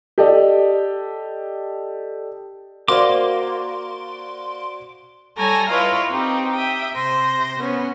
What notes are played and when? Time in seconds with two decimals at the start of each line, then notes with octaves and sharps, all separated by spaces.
0.18 G4 A4 D5 D#5
2.88 A#3 F#4 C5 D5 C6 D6
5.37 G3 A4 C#5 G#5 A#5 A#6
5.68 E4 F4 B4 C#5 D#5 F5
6.11 C4 D#4 G4
6.54 E5 G5 D#6
6.95 C3 C5 A#6
7.59 B3 C#4